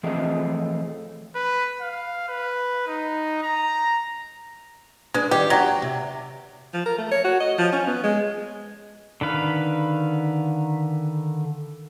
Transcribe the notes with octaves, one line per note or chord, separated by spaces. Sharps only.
E3 F3 A3 C4 G#4 D#5
B4
F5
B4
D#4
A#5
G#3 D4 B4
D#3 G3 G4
E2 F#3 G4
C3
F3
A#4
A3
C#5
F#4
D#5
F3
C#4
B3
G#3
D3 D#3 B4 F5